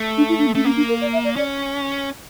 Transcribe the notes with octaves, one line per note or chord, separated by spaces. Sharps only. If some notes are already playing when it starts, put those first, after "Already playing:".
Already playing: A3
D4
E4
D4
A#3
A3 C#4
A#3 C#4
D4
A#4
D5
E5
D5
C#4 D5